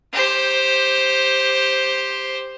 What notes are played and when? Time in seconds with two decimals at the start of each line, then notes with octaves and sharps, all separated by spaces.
0.13 G4 C5